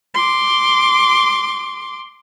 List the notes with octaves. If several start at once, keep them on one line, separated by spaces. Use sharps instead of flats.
C6 D6